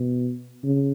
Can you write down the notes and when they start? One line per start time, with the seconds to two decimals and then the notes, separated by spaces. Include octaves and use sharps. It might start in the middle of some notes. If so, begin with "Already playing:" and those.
Already playing: B2
0.64 C#3